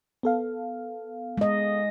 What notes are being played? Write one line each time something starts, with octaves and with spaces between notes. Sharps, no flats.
B3 A4 F5
G#3 D#5